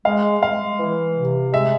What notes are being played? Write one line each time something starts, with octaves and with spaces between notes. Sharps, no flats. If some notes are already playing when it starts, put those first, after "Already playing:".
G#3 F5
G#3 F5
E3
C3
G#3 E5